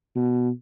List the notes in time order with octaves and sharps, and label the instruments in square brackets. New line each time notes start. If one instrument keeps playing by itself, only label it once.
[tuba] B2